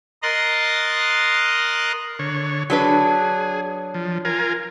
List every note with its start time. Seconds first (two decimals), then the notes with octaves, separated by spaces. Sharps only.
0.23 A#4 D#5 A#5 C6 F#6 A6
2.19 D3 C#5
2.70 F#3 D4 G#4 B4
3.94 F3
4.25 F4 A#4 G#5